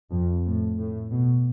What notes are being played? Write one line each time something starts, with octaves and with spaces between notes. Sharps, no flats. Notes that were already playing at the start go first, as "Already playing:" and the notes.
F2
A2
A2
B2